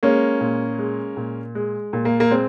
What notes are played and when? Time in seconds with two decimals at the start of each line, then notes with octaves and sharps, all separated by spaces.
0.03 G#3 A#3 C#4
0.41 A#2
0.79 G#3
1.17 A#2
1.55 G#3
1.93 A#2
2.05 A#3
2.20 A#3
2.30 G#3 C4